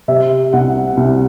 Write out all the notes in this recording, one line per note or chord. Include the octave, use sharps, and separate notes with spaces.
C3 E5
C2 F#5
C2